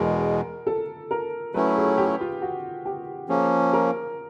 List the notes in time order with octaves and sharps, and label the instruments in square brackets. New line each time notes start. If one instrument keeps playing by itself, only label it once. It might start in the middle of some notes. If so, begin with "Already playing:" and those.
Already playing: [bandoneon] E2 B2 G#3 [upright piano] A#4
[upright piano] A4
A#4
[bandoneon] F#3 A3 C#4 E4 [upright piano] B4
[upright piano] G#4
G4
F4
F#4
G4
[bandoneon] F3 A#3 C#4 [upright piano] G#4
[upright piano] A#4